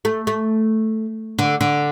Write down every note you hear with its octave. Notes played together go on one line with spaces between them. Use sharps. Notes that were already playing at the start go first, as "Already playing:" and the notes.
A3
A3
D3
D3